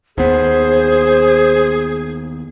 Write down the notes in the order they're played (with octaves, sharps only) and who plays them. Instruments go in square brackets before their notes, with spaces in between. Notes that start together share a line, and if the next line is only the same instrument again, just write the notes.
[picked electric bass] D#2 B3 [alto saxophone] G#4 [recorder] C5